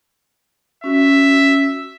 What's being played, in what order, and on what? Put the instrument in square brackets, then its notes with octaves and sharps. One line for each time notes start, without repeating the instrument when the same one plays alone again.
[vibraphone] C#4 F#4 [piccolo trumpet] E5